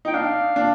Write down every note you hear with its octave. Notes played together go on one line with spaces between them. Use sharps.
D#4 G5
D4 F5
D4